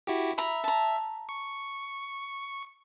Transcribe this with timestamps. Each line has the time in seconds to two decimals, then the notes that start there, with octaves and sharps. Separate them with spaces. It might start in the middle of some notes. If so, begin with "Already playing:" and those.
0.07 E4 F#4 G4
0.38 E5 A#5 B5
0.64 A5 A#5
1.29 C#6